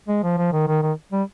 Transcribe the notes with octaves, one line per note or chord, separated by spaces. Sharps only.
G#3
F3
F3
D#3
D#3
D#3
G3